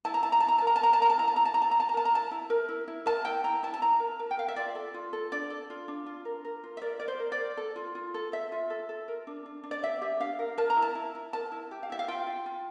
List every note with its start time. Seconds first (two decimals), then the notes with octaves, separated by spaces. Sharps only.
0.05 E4 A5
0.14 A#5
0.23 E4 A5
0.32 A#5
0.40 A5
0.43 E4
0.48 A#5
0.58 A#4 A5
0.67 A#5
0.76 A5
0.81 A#4 A#5
0.93 A5
1.00 A#4 A#5
1.10 A5
1.18 E4 A#5
1.28 A5
1.36 E4 A#5
1.45 A5
1.54 E4 A#5
1.62 A5
1.71 E4 A#5
1.80 A5
1.89 A#5
1.94 A#4 A5
2.05 A#5
2.12 E4 A5
2.31 E4
2.50 A#4
2.69 E4
2.88 E4
3.06 A#4 A5
3.25 E4 G5
3.44 E4 A#5
3.63 E4 A5
3.74 A5
3.81 E4 A#5
4.00 A#4
4.19 A#4
4.31 G5
4.37 A#4 F5
4.48 E5
4.56 F4 D5
4.75 A4
4.94 F4
5.13 A4
5.32 D4 D5
5.50 A4
5.70 F4
5.88 D4
6.06 F4
6.25 A#4
6.45 A#4
6.64 F4
6.77 E5
6.82 A#4 D5
7.00 A#4 D5
7.08 C5
7.20 A#4
7.32 D5
7.38 A#4
7.57 A4
7.76 F4
7.95 F4
8.14 A4
8.32 A4 E5
8.52 F4
8.70 A4
8.89 A4
9.08 A#4
9.27 D4
9.46 D4
9.64 D4
9.71 D5
9.83 G4 E5
10.01 G4 E5
10.20 D4 F5
10.39 A#4
10.58 A#4 A5
10.70 A#5
10.77 E4
10.82 A5
10.95 E4
11.15 E4
11.33 A#4 A5
11.52 E4
11.71 G4
11.83 F5
11.90 E4 E5
11.99 F5
12.08 F4 G5
12.27 F4
12.46 F4